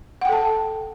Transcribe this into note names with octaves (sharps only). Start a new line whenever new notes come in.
A4 F#5 G5 A5